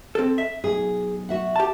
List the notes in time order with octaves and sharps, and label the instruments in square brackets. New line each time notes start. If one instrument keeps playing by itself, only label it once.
[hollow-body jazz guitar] C4 A4
E5
[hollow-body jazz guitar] B1 [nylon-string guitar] G#4
[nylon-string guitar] F#4 E5 F#5
[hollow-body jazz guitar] G4 A5